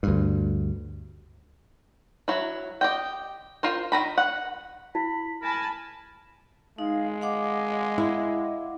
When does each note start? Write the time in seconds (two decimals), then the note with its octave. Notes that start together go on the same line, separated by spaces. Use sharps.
0.03 D2 G2
2.28 F#3 E4
2.81 G4 D#5 G5
3.63 F4 A#4 C5
3.92 D#3 A#5 B5
4.18 F#5
4.95 E4 B5
5.42 A#4 G#5 A5 B5
6.78 G#3 D#4 F5
7.21 D#5 F5 F#5 D6
7.98 E4